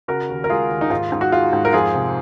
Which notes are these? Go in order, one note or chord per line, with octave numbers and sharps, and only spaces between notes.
C#3 F#4 A#4
D#2
A#4
G#3 F4 G#4
D#2
D#4
G#2 F4
G#2
F#4
G#3 F4
G#2
A#4
F2 F4 G#4
C3